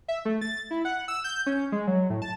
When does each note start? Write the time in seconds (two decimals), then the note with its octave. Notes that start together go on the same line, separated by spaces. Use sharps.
0.08 E5
0.25 A3
0.41 A6
0.71 E4
0.85 F#5
1.08 E6
1.24 G6
1.46 C#4
1.72 G#3
1.87 F#3
2.10 A2
2.22 A5